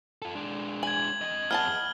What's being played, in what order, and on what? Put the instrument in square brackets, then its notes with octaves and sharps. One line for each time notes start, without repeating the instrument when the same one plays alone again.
[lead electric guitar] F4 A4
G#3 D4
[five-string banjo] G#5 [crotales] G#6 F#7
[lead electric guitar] F2 D#5
[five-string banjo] B3 G#4 A5 [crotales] F6 G7